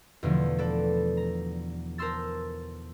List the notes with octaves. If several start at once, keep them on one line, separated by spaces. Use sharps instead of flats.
E2 B2 D3 E3 F3 A3
A4 B4 D5 A5
A#5
A#4 C5 A5 C6 E6 A6